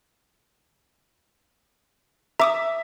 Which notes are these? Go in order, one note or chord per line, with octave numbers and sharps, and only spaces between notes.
E5 A#5 D6 D#6